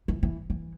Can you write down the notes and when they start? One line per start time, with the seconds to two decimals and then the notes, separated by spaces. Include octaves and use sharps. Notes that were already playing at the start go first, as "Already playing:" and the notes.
0.08 E3
0.23 E3
0.50 E3